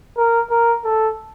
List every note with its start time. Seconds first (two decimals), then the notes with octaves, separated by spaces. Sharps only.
0.17 A#4
0.50 A#4
0.85 A4